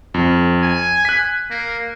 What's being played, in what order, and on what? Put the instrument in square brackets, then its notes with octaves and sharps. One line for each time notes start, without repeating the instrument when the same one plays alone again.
[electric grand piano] F2
[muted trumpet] G#5
[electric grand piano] F#6 B6
[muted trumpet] A#3